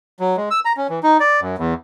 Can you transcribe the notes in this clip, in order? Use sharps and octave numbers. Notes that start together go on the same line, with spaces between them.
F#3
G#3
E6
A#5
C#4
E3
D#4
D5
F#2
E2